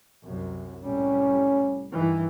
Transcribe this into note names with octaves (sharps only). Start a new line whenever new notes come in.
C2 F#2
C2 A2 G3 C#4
G2 D#3 E3